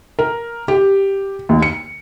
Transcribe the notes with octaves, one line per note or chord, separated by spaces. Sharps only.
A#4
G4
D#2
C#7